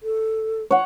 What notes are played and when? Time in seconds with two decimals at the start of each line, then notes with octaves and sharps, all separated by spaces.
0.03 A4
0.71 C#5 F#5